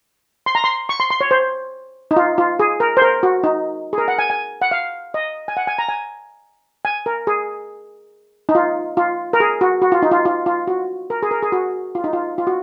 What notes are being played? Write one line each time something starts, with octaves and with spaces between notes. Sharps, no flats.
C6
A#5
C6
C#6
C6
C6
C#5
C5
D#4
F4
F4
G#4
A#4
C5
A#4
F#4
D#4
G#4
A#4
F#5
G#5
G#5
F#5
F5
D#5
G#5
F#5
G#5
A#5
G#5
G#5
A#4
G#4
D#4
F4
F4
A#4
G#4
F#4
F#4
F4
D#4
F4
F4
F4
F#4
A#4
G#4
A#4
G#4
F#4
F4
D#4
F4
F4
F#4